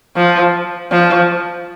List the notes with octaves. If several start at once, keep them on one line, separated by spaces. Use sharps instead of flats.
F3
F3